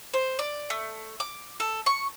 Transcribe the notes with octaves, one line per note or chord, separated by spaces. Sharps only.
C5
D5
A3
D6
A4
C#6